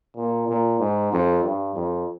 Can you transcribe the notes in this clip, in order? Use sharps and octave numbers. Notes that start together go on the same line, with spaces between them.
A#2
A#2
G#2
F2
G2
F2